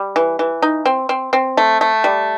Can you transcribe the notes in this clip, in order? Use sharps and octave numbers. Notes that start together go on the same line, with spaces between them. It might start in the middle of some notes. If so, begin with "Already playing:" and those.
Already playing: G3
E3
E3
D#4
C4
C4
C4
A3
A3
G3